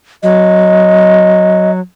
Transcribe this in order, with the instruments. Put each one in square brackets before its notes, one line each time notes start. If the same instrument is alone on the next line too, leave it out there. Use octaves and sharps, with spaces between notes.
[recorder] F#3 [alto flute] D#5